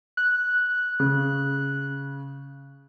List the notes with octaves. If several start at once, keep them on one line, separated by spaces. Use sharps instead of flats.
F#6
C#3